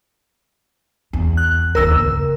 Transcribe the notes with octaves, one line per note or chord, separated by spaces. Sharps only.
E2
F#6
G1 D#2 A#4 E6
C#3